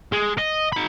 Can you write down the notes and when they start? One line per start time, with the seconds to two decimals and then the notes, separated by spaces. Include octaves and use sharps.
0.12 G#3
0.38 D#5
0.73 D#4 B5